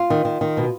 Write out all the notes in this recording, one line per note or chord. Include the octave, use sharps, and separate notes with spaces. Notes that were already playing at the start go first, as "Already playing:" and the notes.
Already playing: F4
D#3
D#3
D#3
B2